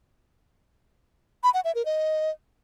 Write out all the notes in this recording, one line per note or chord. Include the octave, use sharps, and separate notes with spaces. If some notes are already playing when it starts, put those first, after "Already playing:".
B5
F#5
E5
A#4
D#5